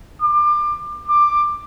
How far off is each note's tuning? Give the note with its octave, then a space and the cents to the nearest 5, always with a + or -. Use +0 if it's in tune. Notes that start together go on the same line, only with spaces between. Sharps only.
D6 +30
D6 +15